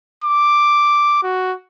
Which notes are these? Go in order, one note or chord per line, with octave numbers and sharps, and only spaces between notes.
D6
F#4